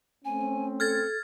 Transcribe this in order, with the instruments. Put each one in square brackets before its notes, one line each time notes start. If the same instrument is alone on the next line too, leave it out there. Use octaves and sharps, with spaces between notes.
[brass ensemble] A3 C4 C#4 [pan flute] G#5
[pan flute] A4 [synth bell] F6 G#6 A6